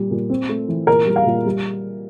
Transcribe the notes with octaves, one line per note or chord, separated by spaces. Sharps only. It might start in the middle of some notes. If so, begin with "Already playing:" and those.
Already playing: A#2 G3
A#2
C4
A3
E3
A#2 A#4
G3
F5
A#2
G3